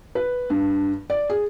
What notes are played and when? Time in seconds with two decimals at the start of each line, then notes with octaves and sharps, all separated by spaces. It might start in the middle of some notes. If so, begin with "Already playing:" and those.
0.15 B4
0.50 G2
1.10 D5
1.30 G#4